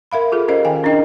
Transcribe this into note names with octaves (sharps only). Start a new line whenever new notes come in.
A#4 E5 F5 B5
F4 G#4 A4
C#4 G4 A#4 C5 D#5 F5
D#3 F5 G5 G#5
C#4 D4 E4 A#4 D#5 G5